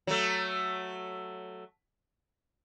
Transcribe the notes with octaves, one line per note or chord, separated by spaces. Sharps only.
F#3 A3